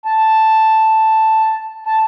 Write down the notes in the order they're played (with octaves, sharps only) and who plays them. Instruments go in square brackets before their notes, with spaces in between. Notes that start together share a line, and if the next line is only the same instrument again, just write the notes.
[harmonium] A5
A5